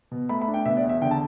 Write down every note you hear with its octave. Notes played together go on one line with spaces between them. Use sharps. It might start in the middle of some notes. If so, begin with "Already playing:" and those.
B2
A3 B5
B5
D4
G5
B2 E5
D5
E2
E5
D3 G5
A5